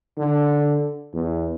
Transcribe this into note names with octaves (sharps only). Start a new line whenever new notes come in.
D3
E2